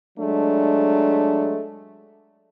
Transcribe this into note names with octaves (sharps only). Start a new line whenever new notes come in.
F#3 G#3 A3 D4